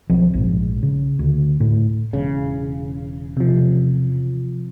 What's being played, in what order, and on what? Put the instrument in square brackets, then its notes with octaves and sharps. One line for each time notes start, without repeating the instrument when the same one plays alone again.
[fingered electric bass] B1 F3 C4
A#1 G#2
C#3
D2
A2
[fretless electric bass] E1 C#3
[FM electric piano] C3 F3